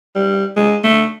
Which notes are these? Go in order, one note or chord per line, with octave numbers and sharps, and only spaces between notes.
G3
G#3
A3